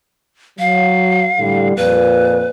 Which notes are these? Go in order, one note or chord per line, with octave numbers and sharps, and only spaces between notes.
F#3 F5
A2 D3 G3
F2 A#2 B4